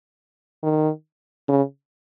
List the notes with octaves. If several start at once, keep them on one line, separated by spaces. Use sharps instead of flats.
D#3
C#3